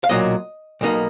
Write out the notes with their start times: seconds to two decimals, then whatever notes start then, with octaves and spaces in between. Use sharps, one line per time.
0.04 F5
0.09 B1 A#2 F#3 A#3 D#5
0.81 B1 B2 A#3 D#4